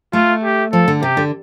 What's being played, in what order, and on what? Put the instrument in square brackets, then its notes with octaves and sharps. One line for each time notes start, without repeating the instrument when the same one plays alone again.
[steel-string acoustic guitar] A3 [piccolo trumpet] F4
[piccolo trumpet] G4
[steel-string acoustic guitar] F3 [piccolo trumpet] A4
[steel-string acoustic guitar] D3
[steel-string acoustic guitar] C3 [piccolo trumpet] G4
[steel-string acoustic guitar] D3